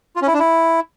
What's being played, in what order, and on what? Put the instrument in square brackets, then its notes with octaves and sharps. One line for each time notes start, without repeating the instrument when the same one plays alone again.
[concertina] F4
C#4
E4
D4
E4